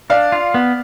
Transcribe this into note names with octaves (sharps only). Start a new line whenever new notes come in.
D4 D5 F5
F4
B3